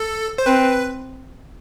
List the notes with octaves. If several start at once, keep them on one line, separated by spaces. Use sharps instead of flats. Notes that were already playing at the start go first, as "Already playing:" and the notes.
Already playing: A4
C5
C4 B4